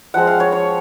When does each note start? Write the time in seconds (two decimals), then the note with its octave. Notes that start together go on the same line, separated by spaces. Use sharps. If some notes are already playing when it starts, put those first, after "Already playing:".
0.14 F3 G#3 C4 F#5
0.27 F5
0.40 C#5
0.52 C#5